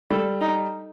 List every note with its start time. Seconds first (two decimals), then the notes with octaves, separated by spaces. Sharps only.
0.11 G3 A4
0.41 D#4